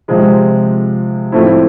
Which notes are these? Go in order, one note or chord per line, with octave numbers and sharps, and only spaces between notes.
C3 F3 G#3 C4
A2 F3 A3 C4 E4